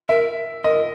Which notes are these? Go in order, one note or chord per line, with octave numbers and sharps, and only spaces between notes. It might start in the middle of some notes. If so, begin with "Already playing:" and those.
A#4 E5
A#4 D#5